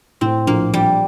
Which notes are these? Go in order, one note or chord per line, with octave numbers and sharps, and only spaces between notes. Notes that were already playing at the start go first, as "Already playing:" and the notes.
A2 C4
A#1 A#3
A#1 G3